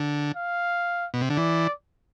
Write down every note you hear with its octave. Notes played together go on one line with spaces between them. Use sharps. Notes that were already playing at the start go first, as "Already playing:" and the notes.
Already playing: D3
F5
B2
C3
D3
E3 D5